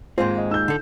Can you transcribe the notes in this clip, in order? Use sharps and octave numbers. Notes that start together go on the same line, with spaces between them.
D#2 G#2 G#3 C4 F4 C5
D#5
D#4 E6 G6
D3 A4